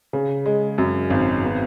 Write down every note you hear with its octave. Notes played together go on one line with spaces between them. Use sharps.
C#3
G#3
F#2
G#1
B3